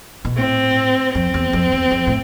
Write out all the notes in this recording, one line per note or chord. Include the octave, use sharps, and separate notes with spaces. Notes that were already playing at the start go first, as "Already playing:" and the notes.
B2
A2 C4
F2 C4
E2
F2
E2
F2
A2